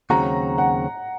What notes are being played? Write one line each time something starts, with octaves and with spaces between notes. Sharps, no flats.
D#2 C#3 F#3 C4 F#4 A#5
F#5